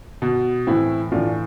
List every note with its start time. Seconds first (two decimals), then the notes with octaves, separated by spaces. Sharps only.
0.22 B2
0.67 A2 E3 C4 E4
1.12 A2 E3 D4 F4